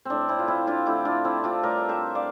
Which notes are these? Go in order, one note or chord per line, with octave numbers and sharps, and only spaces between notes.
A2 G3 C4 D4
C4 E4
F4
C4 E4
D4 F4
D3 A3 E4 G4
D4 F4
C4 E4
D4 F4
A2 G3 A#4 D5
C5 E5
D5 F5